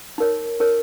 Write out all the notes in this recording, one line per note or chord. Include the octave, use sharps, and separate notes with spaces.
D#4 A#4 C#5
D#4 A#4 C#5